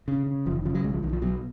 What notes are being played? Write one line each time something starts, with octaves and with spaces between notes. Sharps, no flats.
C#3
C#3
F1 F3
D#3
C#3 F3
F#3
B1 G#3
F3
B1 D#3
F3
B2 F#3